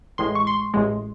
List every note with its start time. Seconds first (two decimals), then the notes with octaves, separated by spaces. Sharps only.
0.18 A1 A2 G#3 C6
0.35 C#6
0.47 C6
0.74 A1 A2 G#3